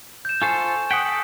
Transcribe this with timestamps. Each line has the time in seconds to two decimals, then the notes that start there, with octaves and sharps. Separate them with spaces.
0.25 G6 E7
0.42 F4 A4 C5 G#5 C#6
0.91 F#5 G5 D#6 B6
1.06 A4